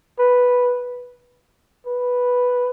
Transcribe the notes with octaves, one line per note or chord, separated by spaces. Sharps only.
B4
B4